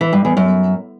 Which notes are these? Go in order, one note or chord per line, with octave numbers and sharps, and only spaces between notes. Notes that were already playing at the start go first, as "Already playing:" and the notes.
E3
G2
E2
F#2